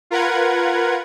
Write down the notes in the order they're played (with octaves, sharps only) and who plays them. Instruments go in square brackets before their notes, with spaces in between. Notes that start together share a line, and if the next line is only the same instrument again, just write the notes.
[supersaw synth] F4 A#4 B4 F#5 G#6